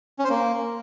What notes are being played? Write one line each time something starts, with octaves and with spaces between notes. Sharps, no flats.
C#4
C5
A#3